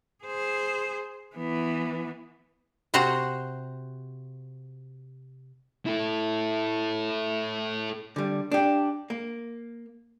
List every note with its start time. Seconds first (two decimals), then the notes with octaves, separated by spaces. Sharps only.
0.24 G#4 C5
1.36 E3 B3
2.94 C3 F#4 C5 F#5 A#5
5.87 E4 A4
8.16 D3 G3
8.51 D4 G4
9.10 A#3